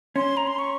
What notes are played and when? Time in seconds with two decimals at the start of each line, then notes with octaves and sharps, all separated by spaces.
0.16 C#4 C6
0.37 A#5
0.47 C6
0.59 C#6